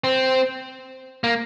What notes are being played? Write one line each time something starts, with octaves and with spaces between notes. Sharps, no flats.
C4
A#3